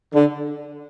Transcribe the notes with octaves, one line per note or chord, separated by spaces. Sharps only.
D3